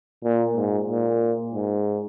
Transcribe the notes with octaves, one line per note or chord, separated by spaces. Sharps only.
A#2
G#2
A#2
G#2